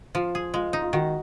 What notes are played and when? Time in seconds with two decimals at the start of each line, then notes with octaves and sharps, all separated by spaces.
0.15 F3 F4
0.35 G#4
0.54 G#3 F4
0.73 D#4
0.82 F4
0.93 D#3 F#4